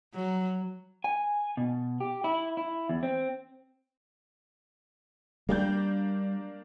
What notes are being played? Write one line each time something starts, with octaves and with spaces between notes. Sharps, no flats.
F#3
G#5
B2
G4
E4
E4
E2
C4
G3 A#3 D4 G6